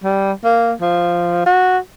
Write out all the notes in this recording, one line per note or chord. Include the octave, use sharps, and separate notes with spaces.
G3
A#3
F3
F#4